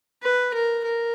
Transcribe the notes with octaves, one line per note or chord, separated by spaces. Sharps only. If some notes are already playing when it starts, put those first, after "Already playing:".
B4
A#4
A#4